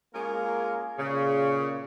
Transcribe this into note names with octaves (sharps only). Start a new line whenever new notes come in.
G#3 A#3 C#4 F4 G#4 A#4
A#2 C#3